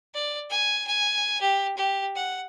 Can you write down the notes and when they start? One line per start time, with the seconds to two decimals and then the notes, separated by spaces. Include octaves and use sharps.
0.14 D5
0.50 G#5
0.87 G#5
1.41 G4
1.77 G4
2.16 F#5